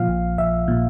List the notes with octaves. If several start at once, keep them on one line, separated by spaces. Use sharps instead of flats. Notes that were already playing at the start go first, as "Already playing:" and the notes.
Already playing: A#2 F3 F5
A#1
A#1 E5
A#2